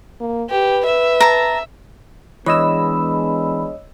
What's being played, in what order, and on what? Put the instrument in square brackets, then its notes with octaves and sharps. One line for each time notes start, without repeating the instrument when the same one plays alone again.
[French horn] A#3
[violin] G4 [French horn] B4
[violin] E5
[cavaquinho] A5 A#5
[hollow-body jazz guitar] E3 [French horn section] G#3 B3 D4 [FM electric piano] C#5 D#5 E6 [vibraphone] B5